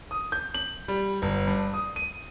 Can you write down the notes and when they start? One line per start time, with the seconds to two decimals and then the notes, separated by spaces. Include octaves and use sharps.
0.11 D#6
0.32 G6
0.55 F#7
0.88 G3
1.22 G1
1.47 G2
1.74 D#6
1.96 D#7